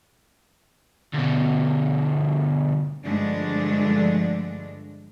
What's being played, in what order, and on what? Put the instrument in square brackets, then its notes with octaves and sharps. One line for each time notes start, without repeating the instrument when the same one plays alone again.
[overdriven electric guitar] D2 B2
[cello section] G2 D3 F3 G#3 A3 D4